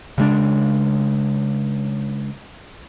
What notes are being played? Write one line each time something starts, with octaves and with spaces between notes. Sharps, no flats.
C#3 G#3 D4